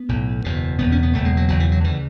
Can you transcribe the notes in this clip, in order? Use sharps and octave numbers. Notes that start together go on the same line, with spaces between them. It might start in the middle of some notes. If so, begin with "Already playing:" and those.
Already playing: B3
B1 A2
F#1 E2 B2
F#1 E2 B2 B3
C#4
B3
F#1 E2 B2 A3
G#3
F#3
F#1 E2 B2 F#3
E3
F#3
D2 C#3 E3